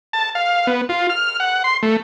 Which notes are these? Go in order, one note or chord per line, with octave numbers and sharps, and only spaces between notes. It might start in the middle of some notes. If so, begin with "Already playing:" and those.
A5
F5
B3
F4
F6
F#5
C6
A3